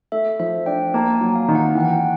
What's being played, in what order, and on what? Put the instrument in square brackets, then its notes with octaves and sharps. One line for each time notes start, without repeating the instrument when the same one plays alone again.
[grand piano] A3 [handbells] E5
[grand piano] F3 [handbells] E5
[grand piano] D4 [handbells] G5
[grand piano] A#3 [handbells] A5
[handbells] G#5
[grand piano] F#3
[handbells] F5
[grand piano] D#3
[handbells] F#5
[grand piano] E3 [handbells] G5
[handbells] F#5
G5